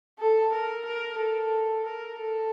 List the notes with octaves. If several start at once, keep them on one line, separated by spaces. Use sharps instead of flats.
A4
A#4
A#4
A4
A#4
A4